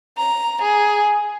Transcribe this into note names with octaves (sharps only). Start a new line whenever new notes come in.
A#5
G#4